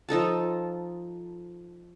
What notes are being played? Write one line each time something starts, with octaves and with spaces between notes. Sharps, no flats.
F3 D#4 A4 A5